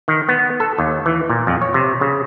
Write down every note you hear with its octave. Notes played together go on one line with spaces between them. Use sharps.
D#3
B3
A4
D#2
E3
A#2
F2
C#5
C3
C#3